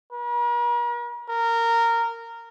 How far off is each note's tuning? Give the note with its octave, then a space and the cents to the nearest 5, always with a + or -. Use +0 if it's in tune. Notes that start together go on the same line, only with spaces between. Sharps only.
A#4 +45
A#4 -15